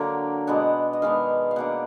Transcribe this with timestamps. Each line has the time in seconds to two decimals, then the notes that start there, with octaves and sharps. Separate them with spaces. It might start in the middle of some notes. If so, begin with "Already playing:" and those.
Already playing: D3 F#3 A#3 D4
0.47 B2 G#3 B3 D4 F#5
0.93 D#5
1.02 D#3 G#3 B3 D4 F5
1.51 F5
1.56 B2 A#3 D4 F#5